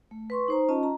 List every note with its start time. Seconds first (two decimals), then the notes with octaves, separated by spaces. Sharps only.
0.11 A3
0.30 B4 C6 C#6
0.48 D#4 C5 A#5
0.69 C#4 F4 D#5 A5
0.83 A#5